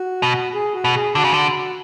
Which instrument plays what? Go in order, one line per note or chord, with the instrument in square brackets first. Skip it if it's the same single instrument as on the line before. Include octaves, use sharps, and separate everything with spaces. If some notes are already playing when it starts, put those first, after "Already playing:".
Already playing: [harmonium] F#4
[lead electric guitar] B2
[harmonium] G#4
F#4
[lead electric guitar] B2
[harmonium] G#4
[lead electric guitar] D3 [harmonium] F#4
[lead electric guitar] C#3
D3